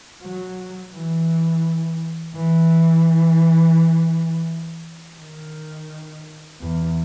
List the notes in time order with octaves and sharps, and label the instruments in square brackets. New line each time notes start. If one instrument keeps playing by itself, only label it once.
[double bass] F#3
E3
E3
D#3
E2